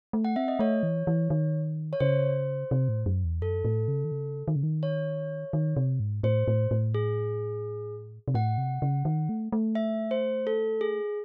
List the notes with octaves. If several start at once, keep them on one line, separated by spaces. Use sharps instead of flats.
A3
F#5
C4 E5
D#5
A3 C#5
E3
E3
D#3
C#5
C#3 C5
C3
A2
F#2
E2
F#2 A4
A2
C#3
D#3
C#3
D#3
C#3
D#3
C#5
D#3
C3
G#2
A2 C5
A2
A2
G#4
C3
A2 F#5
C3
C#3
D#3
A3
A3
E5
C5
A4
G#4